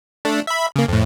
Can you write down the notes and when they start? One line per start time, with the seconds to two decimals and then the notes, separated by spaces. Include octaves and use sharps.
0.25 A3 D4
0.47 E5 B5
0.76 C#3 A#3
0.88 F2 A2